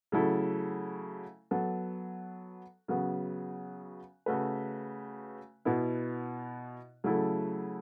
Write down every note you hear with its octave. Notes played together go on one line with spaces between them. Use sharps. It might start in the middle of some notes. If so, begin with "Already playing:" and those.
C#3 F#3 A3 E4 A4
F#3 B3 A4
C#3 F#3 B3 F#4
C#3 A3 F#4 B4
B2 B3 E4
C#3 F#3 A3 E4 A4